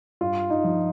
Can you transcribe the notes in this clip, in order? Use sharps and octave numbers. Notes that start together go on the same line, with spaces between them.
G2 F4
D#4
F3